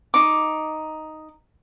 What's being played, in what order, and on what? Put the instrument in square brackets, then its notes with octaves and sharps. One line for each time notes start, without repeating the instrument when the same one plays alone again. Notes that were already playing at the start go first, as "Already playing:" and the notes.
[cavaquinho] D#4 D6